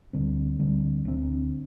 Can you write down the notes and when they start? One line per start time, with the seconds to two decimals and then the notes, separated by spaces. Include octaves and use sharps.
0.13 D2 D3 G3 C4
0.59 D2 D3 G3 C4
1.05 D2 D3 G3 C4